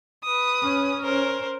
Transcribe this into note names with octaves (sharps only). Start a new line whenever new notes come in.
B4 D#6
C#4
A#4 C5